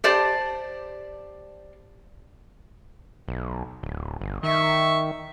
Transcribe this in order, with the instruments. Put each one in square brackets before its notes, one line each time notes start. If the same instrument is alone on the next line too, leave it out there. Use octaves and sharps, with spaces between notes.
[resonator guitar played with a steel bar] G4 C5 D5 A5
[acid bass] B1
D1
G1
[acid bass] D#3 [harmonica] E5 C#6